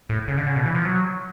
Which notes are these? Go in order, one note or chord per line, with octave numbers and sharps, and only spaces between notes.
A2
C#3
D3
C#3
B2
E3
F3
F#3